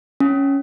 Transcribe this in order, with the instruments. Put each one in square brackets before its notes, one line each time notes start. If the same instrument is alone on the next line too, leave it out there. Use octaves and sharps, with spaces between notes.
[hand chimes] C#4